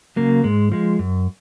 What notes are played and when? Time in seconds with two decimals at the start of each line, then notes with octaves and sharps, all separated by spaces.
0.16 C#3 F#3 A#3
0.44 G#2 G#3
0.72 F3 G#3
0.99 F#2